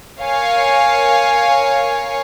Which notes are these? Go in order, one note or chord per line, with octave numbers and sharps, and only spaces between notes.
A#4 C#5 F5 G#5